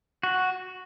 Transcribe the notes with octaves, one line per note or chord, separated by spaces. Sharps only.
F#4